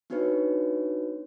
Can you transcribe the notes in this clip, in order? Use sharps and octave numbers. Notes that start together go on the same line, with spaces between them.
B3 D4 D#4 F#4 B4 C#5